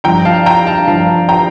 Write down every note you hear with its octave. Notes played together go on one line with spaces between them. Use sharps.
G2 F3 G5 A#5
F5 A5
G5 A#5
F5 A5
G2 F3 F5 A5
G5 A#5